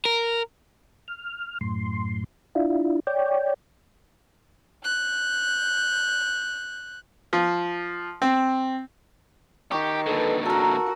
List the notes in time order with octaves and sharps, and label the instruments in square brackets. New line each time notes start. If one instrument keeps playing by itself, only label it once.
[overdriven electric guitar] A#4
[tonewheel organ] F6
F#2 A2 C6
D4 E4 F4
C#5 D5 G5
[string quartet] F#6 G6
[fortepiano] F3
C4
[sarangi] D#3 [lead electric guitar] G4 [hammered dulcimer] C#6
[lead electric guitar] A#2 D3 [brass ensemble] A4 B4
[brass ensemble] B1 E3 A#5 [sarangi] F#4 [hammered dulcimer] A4 A#4